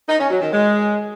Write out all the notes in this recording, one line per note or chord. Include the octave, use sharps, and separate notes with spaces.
D#4
C#4
F#3
D#3
G#3